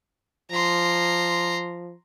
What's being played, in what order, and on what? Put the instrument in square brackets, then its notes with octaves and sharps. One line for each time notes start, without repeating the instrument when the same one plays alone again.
[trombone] F3 [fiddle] A#5 C6